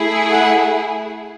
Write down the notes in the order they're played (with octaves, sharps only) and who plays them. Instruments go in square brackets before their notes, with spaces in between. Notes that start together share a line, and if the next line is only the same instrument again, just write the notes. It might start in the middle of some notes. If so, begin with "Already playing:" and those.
Already playing: [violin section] A3 E4 G#4
F#5